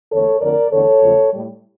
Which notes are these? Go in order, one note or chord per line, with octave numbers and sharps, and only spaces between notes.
E2 D3 A3 A4 C#5
F2 D3 A3 A#4 D5
E2 D3 A3 A4 C#5
E2 C#3 F3 A3
A2 G3